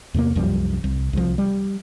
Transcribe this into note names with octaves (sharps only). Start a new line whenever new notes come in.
E2 C3 G#3 A#3
C2 F#2 F3 G3
C2
C2 F3
G3